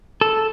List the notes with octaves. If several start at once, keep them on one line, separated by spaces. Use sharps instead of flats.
A4